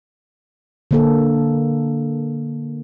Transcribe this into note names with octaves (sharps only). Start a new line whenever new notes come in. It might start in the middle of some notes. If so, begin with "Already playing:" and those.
D3 A#3 A4